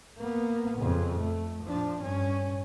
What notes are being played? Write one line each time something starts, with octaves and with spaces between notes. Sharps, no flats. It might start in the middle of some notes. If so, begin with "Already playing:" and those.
A#3 B3
F2 C#3
A3
F3 D4
G2 C#4